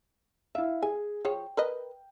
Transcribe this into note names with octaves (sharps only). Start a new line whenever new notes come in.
E4 E5 F5
G#4 G#5
F3 G#4 C#5 G5
A#4 B4 D#5